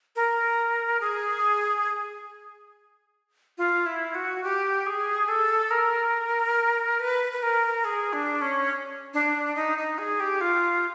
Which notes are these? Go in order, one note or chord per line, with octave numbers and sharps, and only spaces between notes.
A#4
G#4
F4
E4
F#4
G4
G#4
A4
A#4
B4
B4
A#4
G#4
D4
C#4
D4
D#4
D#4
G#4
G4
F4